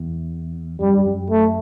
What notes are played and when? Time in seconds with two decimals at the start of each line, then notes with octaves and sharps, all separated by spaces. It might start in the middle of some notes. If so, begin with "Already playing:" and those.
Already playing: E2
0.80 F#2 G3
0.93 G2
1.05 F#2
1.30 A3